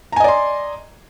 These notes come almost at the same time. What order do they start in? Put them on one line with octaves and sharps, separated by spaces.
A#5 G#5 D#5 D5 C6